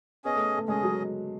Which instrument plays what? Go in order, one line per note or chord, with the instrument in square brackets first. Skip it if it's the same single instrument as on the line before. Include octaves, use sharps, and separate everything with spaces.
[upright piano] B3 [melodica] C#4 G#4 D#5
[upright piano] A3
A3
[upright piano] G#3 [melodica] C#4 G#4 D#5
[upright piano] F#3